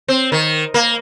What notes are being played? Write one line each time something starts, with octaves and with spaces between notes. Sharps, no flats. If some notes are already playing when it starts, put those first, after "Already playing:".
C4
D#3
A#3